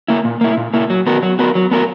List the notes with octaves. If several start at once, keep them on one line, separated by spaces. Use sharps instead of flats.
A#3 E4
A#2
A#3 E4
A#2
A#3 E4
F#3
B3 F#4 A#4
F#3
B3 F#4 A#4
F#3
B3 F#4 A#4